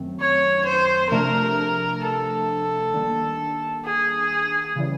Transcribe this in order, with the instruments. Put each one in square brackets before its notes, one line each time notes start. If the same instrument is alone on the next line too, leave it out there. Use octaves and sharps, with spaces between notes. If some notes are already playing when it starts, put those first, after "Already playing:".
Already playing: [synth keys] F#2 D#3 F#3 A3 C4
[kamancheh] C#5
C5
[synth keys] C3 F3 A3 D4 [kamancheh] A#4
[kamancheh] A4
[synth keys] D#3 G3 A#3 D4
[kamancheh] G#4
[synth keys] C#3 E3 G3